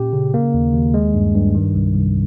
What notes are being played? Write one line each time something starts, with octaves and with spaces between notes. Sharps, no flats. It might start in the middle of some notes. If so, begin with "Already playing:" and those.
Already playing: A#2 C#4 G4
C#3
A#3
D#2
D#2
G#3
G2
G2
D#3
C2
C2